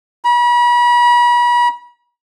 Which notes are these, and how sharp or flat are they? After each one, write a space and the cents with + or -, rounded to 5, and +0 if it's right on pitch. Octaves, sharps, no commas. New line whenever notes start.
B5 -40